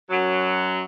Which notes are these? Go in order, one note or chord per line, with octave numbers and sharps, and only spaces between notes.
F#2 F#3